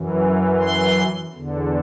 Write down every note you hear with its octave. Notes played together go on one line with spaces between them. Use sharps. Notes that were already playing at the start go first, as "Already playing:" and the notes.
Already playing: F#2 E3
C6
E2 D3